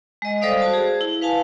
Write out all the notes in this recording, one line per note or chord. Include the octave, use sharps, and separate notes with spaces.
G#3 D#5
G3 A4 C5 D5 F5 D#6
F#4 C5 A5
G#4
E4
B4 F5 G#5 A5